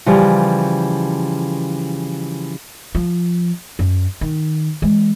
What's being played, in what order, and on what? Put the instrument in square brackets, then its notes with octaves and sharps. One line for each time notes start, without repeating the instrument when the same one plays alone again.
[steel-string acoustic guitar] C#3 E3 F3 G3
[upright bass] F3
F#2
D#3
E3 G#3